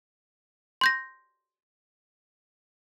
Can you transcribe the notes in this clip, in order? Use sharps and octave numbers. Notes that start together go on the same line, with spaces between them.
C6 G6 A#6